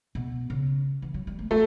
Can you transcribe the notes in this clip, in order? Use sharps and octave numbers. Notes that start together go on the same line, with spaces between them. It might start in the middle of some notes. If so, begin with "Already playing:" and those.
B2
C#3
E3
F#3
G3
A3
A3 B3